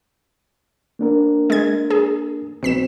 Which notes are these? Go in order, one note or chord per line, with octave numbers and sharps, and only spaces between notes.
A#3 D4 A#4
G#3 G#6
G#4
B1 C4 B6 E7